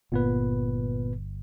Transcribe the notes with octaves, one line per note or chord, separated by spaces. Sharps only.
G1 A#2 B3 B4